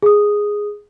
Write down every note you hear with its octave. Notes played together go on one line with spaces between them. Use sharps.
G#4 D#6